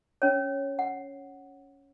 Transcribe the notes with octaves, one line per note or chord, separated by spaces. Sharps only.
C#4 C#5
F#5